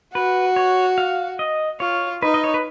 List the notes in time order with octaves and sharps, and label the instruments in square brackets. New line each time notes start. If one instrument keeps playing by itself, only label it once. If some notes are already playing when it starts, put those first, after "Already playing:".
[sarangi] F#4 [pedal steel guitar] B4
[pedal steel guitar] C#5
F5
D#5
[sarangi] F4 [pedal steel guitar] C#5
[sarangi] D#4 [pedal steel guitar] B4
[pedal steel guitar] D#5
C#5
B4